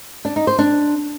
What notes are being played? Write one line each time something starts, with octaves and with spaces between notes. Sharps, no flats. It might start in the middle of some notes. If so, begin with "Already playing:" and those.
D4
D#4
C5
D4